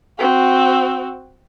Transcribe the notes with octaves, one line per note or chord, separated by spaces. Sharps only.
C4 F#4